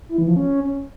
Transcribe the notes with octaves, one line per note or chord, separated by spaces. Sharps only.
E4
E3
F3
C#4